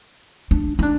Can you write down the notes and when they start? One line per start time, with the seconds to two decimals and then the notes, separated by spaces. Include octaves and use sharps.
0.51 D4
0.79 D#4
0.83 D4